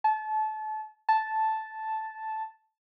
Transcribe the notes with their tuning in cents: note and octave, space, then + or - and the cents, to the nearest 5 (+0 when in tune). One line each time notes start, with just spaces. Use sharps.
A5 -30
A5 -5